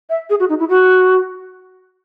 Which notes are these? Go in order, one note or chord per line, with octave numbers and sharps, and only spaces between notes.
E5
G#4
F#4
D#4
E4
F#4